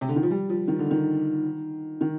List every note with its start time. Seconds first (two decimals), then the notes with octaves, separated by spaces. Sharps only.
0.01 C3
0.09 D3
0.16 D#3
0.23 F3
0.31 G3
0.49 F3
0.68 D#3
0.79 D3
0.91 D#3
2.01 D#3